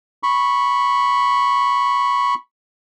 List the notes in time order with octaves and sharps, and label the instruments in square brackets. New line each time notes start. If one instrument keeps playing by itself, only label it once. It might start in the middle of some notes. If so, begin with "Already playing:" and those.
[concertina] B5 C#6